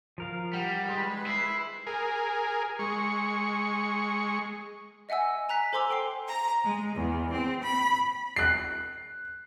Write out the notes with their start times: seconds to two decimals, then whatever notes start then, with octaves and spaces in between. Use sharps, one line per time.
0.18 F3 A#4 F5
0.53 G3 F#5
0.88 G#3 B4 C6
1.27 E4 C7
1.87 G#4 A#4
2.79 G#3 C#6
5.09 D#5 E5 F#5 G#5 E6
5.49 G#5 A#5 F#6 B6
5.73 A4 C5 G#5 C6 D6 E6
5.91 G5 C6 C7
6.25 A#5
6.63 G#3
6.94 E2
7.31 C4
7.62 B5
8.36 F#6 C7